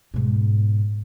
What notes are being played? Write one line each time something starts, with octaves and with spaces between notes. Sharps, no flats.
G#2 B2